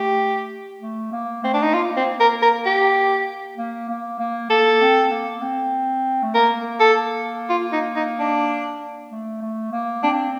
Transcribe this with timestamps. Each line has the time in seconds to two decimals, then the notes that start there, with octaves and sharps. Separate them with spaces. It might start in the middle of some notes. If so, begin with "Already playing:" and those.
Already playing: A3 G4
0.81 A3
1.12 A#3
1.42 A3 C4
1.54 D4
1.63 D#4
1.74 A#3 F4
1.97 C4
2.20 A#4
2.42 A#4
2.66 G4
3.57 A#3
3.89 A#3
4.19 A#3
4.50 A#3 A4
4.81 C4
5.11 A#3
5.42 C4
6.23 A3
6.35 A#3 A#4
6.80 A4
7.49 F4
7.73 D#4
7.96 D#4
8.19 D4
9.11 A3
9.42 A3
9.72 A#3
10.03 C4 D4